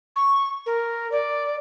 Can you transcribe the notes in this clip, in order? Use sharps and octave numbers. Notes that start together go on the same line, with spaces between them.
C#6
A#4
D5